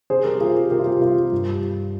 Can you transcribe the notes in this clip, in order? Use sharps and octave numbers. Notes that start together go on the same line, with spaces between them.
C3 G#4 C5
G3 G4 A#4
C3 F4 G#4
G3 G4
C3 G4 A#4
F4
G3 G4
C3 F4
G3
G2
G3